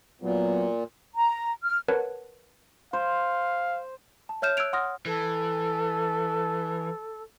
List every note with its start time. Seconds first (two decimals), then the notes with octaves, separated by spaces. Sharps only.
0.22 A#2 F#3 B3
1.15 A#5
1.64 F6
1.88 A#4 B4 C#5 F#5 A5
2.93 C5 F5
4.29 A5
4.42 C#5 E5 F6 G6 E7
4.57 E6 F#6 G#6 D7 F7
4.73 F#5 C6 D#6 F6 A#6
5.06 E3 A4